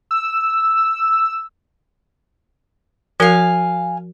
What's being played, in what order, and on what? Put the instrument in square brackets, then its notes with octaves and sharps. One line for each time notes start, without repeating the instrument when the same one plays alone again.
[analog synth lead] E6
[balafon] F3 F#4 A#4 [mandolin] F5 G#5